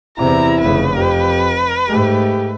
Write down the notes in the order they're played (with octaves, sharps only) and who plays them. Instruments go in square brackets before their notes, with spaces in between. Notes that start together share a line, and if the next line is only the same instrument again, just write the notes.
[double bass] E2 C3 [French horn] E4 [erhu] A#5
[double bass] F1 C#3 [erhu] B4
[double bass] F2 [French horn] G4
[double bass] G#2 A3 [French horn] G4